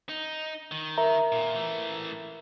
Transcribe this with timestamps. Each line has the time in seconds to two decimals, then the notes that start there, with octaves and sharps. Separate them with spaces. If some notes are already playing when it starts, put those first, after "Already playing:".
0.09 D#4
0.72 D#3
0.98 A#4 E5 A#5
1.32 A#2
1.55 E3 A3